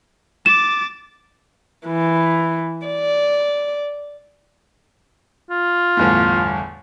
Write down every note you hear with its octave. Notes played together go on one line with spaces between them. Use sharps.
D6 A6 E7
E3
D5
F4
G1 E2 A2